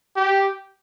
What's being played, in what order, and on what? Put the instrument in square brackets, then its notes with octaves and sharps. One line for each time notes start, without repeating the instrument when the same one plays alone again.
[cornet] G4